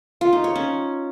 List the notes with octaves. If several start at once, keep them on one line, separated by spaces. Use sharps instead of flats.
F4
D#4
C#5
C#4